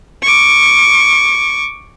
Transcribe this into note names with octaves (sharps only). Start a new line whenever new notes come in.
C#6 D6